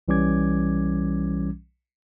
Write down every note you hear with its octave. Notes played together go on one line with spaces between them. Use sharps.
B1 E3 G3 C#4 D6 G#6